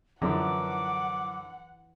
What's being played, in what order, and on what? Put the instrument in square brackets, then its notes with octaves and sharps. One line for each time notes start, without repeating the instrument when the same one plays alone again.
[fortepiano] F#2 D3 F3 [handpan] E3 [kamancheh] F#5 [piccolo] D6